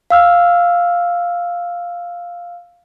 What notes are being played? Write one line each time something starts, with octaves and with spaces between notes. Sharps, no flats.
F5 E6 F6